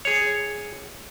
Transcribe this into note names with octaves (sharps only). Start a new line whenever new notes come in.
G#4 C#5